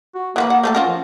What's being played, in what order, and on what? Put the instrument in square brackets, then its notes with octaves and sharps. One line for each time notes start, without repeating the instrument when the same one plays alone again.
[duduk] F#4
[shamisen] E3 F#4 B4 [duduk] A#3
[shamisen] F#5
A3 C4 A4
[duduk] C#4 [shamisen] F4 F#4 A#4
[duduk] F3